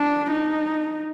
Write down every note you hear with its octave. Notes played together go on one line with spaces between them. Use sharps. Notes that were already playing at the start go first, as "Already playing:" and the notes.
Already playing: D4
D#4